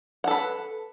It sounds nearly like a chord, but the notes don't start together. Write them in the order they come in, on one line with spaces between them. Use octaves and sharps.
F#5 A4 B4